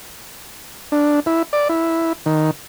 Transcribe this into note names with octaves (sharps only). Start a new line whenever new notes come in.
D4
E4
D5
E4
D#3